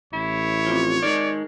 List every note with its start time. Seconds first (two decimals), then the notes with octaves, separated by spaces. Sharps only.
0.13 A1 E4 C#5
0.66 C3 F3
1.03 D#3 G#3 D5